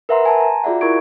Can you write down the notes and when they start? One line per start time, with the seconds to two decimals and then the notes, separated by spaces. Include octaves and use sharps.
0.09 A#4 B4 E5 F#5 A#5 C6
0.25 G#5 A5 C6
0.40 A#5
0.64 F4 F#4 G#4 D5 E5 F#5
0.81 E4 A#4 B5 C#6 G#6 D7